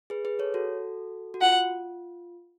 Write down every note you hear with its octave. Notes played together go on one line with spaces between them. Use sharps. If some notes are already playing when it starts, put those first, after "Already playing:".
G#4 B4
G#4 B4
A4 C#5
F#4 A4
F#4
F4 F#5